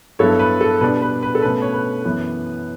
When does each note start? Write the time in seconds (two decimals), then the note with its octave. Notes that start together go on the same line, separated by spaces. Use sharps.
0.19 G2 F#3 B3 E4 A4 C#5
0.39 B4
0.61 A4
0.81 B2 G3 D4 B4
1.02 B4
1.23 B4
1.35 A4
1.42 B2 A3 C#4 B4
1.62 C#5
1.74 B4
2.05 F#2 E3 B3